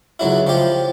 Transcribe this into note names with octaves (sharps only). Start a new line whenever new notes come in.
C#2 F#3 E4
F3 G4